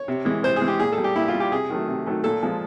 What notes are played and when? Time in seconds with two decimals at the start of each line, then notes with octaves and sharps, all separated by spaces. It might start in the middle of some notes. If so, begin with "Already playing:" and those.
Already playing: C#5
0.08 C3
0.25 E3 G#3
0.43 C3 C5
0.56 G#4
0.61 E3 G#3
0.68 G4
0.79 A#2 G#4
0.92 A4
0.98 G3
1.04 G4
1.16 A#2 E4
1.28 F4
1.34 G3
1.40 G4
1.52 C3 G#4
1.70 D#3 F#3 A3
1.88 C3
2.06 D#3 F#3 A3
2.24 A#2 A4
2.43 F3 G#3